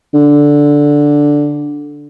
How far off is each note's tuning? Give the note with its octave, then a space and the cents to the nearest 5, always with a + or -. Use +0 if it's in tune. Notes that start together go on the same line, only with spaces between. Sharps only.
D3 -5